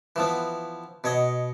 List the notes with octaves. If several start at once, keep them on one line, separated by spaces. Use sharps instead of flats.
E3 F3 B3
B2 C#5 D#5